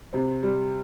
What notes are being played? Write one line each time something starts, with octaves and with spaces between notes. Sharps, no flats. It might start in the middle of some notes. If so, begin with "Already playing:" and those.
C3 C4
G3